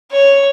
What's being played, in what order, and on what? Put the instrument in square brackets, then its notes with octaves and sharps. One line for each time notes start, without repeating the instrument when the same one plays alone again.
[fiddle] C#5